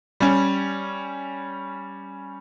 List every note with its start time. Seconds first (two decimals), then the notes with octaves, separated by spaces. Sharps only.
0.20 G3 C#4